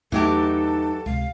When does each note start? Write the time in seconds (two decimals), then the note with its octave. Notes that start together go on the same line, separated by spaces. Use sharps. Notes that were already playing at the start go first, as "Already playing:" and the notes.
0.12 E2 E3 F#3 A3 D#4 G4 A4
1.06 C#2 C3 F5